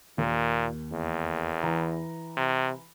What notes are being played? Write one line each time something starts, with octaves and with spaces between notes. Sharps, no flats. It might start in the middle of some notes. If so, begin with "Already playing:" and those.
D#2 A#2
E2
E3 A#5
C3